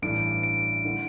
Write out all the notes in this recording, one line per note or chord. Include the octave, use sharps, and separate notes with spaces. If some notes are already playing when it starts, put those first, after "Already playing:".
A1 G2 E3 A3 D4 D7
D7
D3 A3 E4